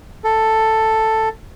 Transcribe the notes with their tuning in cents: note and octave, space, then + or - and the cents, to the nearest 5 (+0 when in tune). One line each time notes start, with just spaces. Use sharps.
A4 +5